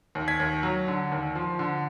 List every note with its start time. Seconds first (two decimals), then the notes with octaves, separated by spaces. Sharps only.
0.15 D#2
0.28 G#6 B6
0.40 D#2
0.63 F#3
0.88 D3
1.12 D#2
1.35 F3
1.59 D3